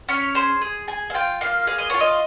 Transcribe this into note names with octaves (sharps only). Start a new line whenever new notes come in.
C#4 C#5
G#4 C5
G#4
G#4 G#5
F5
F4 G5
A#3 F5
G#4 F5
D#5
F4 C#5
D#5